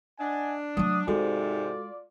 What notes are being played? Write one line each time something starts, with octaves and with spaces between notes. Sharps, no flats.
D4 D#5 F#5 G#5
F#3 A3 D6 D#6
G#2 C3 G#3 F4 F#4 A4 D5